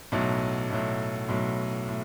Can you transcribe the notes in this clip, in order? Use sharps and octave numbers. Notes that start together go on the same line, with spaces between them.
B1 A2 F#3
B1 A2 F#3
B1 A2 F#3
A2